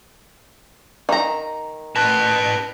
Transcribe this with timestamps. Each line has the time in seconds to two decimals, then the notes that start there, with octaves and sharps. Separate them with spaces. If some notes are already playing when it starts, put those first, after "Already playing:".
1.09 D#3 A#5
1.96 B4 A5